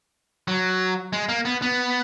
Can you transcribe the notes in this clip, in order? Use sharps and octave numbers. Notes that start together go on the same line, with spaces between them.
F#3
G#3
A#3
B3
B3